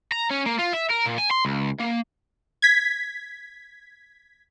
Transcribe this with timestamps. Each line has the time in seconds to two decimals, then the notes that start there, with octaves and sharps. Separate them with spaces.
0.12 A#5
0.31 C#4
0.46 A#3
0.59 F4
0.74 E5
0.91 A#4
1.06 A#2
1.18 G#5
1.31 C6
1.45 C#2
1.80 A#3
2.62 G#6 B6